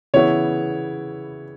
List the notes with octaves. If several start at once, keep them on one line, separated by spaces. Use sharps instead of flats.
C#3 E3 B3 E4 C#5